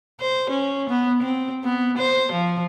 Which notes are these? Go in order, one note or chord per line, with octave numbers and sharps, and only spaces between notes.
C5
C#4
B3
C4
B3
C5
F3